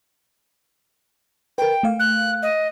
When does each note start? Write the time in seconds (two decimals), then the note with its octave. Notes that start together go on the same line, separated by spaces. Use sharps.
1.58 A#4 B4 G5
1.83 A3 F5
1.99 F#6
2.42 D#5